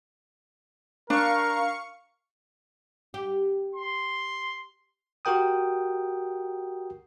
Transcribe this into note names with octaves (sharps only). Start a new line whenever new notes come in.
D4 A#4 F5 C#6 C#7
G4
C6
F#4 G4 A#4 G5 D#6